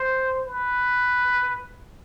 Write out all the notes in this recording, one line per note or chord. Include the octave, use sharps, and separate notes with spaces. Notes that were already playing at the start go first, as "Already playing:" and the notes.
Already playing: C5
B4